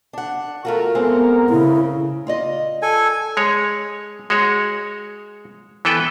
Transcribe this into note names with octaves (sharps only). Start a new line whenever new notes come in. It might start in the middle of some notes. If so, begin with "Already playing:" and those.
D4 F#5
A3 F4 F#4 A#4
G#3 A3 B3 C4
C#3 E4
F4 D5 D#5
A4 G#5
G#3 C#5
G#3 F#4 C#5
E3 B3 A4 B4 G5